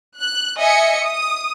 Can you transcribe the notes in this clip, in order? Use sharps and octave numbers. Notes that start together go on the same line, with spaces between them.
F#6
D#5 E5 G#5 C#7
D#6